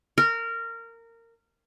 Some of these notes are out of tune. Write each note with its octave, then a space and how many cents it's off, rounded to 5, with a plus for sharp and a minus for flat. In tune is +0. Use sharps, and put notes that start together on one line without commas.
A#4 -20